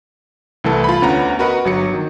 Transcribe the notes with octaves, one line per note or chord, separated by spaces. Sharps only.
C2 E3 A3 A4
F4 B5
D2 B3 C#4 F#5 A#5
F#4 A#4 B4 D#5 F#5
G1 F#3 C#7
D#3